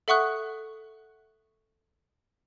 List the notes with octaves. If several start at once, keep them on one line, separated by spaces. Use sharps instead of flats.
A4 E5 F#5 C#6 D#6 F#6